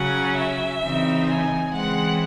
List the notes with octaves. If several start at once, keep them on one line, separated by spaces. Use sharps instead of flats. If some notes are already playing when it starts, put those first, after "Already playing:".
Already playing: C#3 F#3 C#4 F#5
E5
C#3 E3 C4 D#4
G#5
C#3 E3 G#3 C4 F#5